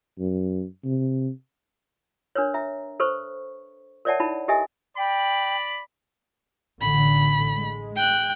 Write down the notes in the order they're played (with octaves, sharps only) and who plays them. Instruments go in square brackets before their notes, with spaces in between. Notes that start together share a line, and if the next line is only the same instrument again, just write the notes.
[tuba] F#2
C3
[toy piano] D4 A#4 B4 C#5
E5 A#5
A4 B4 C5 C#6
A#4 C#5 D5 E5 F#5 A5
D#4 E4 A5 B5
G4 A4 A#4 D#5 E5 G#5
[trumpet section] D5 B5 [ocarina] G5
[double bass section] A1 D3 [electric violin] B5
[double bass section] G#3
[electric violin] G5 F#6